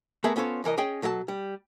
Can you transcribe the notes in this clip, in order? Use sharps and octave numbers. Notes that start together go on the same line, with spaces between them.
A3 B3 G#4 A#4 E5
B3 C#4 F4 A4 C5 C#5
C2 E3 A#4 D#5
C#4 G#4 C#5 D#5 G5
B2 F#3 A4 D5 A5
G3